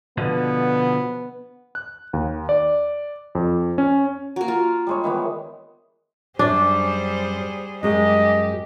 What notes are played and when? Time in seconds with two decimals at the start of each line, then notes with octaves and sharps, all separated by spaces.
0.18 B2 D3 F3 B3
1.75 F#6
2.13 D#2
2.49 D5
3.35 F2
3.78 C#4
4.36 F#3 A#3
4.48 F4 A#4
4.87 G3 G#3 C#5
5.04 D#3 E3 B3
6.39 F#2 G3 D4 G#4 C5
7.83 F#2 G#3 G4 D#5